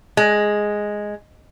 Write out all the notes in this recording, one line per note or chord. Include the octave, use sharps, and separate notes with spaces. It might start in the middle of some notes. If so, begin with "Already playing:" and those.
G#3